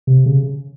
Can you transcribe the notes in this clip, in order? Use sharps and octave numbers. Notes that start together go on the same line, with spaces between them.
C3
C#3